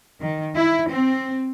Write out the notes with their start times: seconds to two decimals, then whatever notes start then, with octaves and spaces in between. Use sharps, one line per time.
0.19 D#3
0.55 E4
0.89 C4